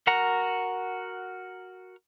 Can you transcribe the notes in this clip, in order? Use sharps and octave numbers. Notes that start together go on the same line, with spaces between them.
F#4 A#4 F#5 A#5